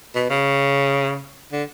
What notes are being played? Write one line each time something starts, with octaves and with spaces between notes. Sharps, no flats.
B2
C#3
D3